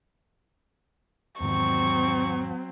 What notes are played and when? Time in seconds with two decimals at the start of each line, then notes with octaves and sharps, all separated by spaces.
1.41 E2 G#2 D#3 F#3 C4 C#6